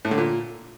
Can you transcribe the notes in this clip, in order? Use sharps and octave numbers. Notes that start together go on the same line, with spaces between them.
A2
D3
A#2